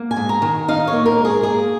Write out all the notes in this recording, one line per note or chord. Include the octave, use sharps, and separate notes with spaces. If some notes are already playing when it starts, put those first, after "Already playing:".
Already playing: A#3
G#5
G#2
A#5
D#3
D#4 F5
C#5
A#3
A#4
G#2
G#4
A#3 G#4